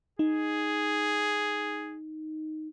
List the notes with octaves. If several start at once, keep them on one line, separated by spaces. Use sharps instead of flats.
D#4 G#4